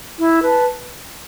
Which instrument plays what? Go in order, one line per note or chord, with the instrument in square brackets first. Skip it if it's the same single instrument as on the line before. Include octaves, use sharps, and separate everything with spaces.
[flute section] E4
B4 A5